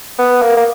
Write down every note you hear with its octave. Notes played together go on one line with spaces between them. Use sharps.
B3
A#3
A#3